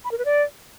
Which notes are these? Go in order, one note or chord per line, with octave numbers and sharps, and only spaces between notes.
B5
A#4
B4
D5